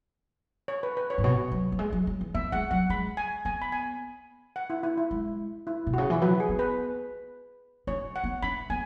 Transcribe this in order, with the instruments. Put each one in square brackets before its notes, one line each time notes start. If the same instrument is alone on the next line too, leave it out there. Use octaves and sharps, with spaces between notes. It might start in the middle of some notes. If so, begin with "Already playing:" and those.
[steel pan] C#5
B4
B4
C#5
[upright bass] G#2
[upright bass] B2 [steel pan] C#5
[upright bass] F#3
F#3
G#3
F#3
G#3
E3
[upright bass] B3 [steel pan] E5
[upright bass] G#3 [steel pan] F#5
[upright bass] F#3 [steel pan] F#5
[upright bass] G#3 [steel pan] B5
[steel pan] G#5
[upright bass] B3 [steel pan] G#5
[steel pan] B5
G#5
F#5
E4
E4
E4
[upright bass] G#3
[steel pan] E4
[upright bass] B2
[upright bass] C#3 [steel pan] F#4
[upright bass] E3
[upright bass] F#3 [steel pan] B4
[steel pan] G#4
[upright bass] B3
[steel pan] B4
[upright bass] C#4 [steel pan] C#5
[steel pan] F#5
[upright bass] B3
[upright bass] C#4 [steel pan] B5
[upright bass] B3 [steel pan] G#5